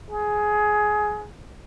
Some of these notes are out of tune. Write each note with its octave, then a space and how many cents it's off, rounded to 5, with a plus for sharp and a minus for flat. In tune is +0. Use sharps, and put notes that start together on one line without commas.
G#4 +15